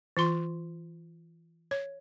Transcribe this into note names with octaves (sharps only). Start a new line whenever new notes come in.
E3 F4 C6
C#5